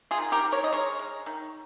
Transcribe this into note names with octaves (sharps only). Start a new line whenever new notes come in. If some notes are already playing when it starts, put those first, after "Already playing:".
F4 G#4
D#3
G4 A#4
D#3
A#4 C#5
D#5
G#3 A#4 C#5
G#3
D#3